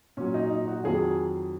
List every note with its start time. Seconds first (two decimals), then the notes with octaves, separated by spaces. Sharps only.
0.17 A#2 F#3 C#4
0.34 D#4
0.50 D#4
0.67 F#4
0.84 F2 D#3 F#3 G#4